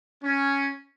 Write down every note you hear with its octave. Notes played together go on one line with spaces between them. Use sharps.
C#4